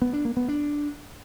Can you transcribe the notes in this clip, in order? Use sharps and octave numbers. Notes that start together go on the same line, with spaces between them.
B3
D4
A#3
B3
D4